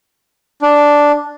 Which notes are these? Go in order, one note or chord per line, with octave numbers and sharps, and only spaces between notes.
D4